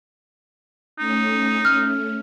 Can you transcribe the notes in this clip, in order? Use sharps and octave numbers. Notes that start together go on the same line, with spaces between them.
A3 C#4 D#4
F6